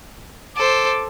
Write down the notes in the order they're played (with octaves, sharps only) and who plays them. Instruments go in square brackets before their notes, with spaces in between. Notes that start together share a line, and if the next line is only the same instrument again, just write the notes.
[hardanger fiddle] A4 C5 [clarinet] D6